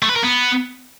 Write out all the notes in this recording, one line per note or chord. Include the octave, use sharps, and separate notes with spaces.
A3
B4
A#4
B3